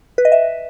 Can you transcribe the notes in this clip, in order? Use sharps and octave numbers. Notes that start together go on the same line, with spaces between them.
B4
D#5
E5